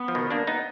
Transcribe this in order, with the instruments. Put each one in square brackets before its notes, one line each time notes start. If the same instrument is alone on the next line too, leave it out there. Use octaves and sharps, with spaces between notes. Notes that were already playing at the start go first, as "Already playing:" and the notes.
Already playing: [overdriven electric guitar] B3
[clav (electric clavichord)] F3
B2 D#3
A#3 D4
B3 D#4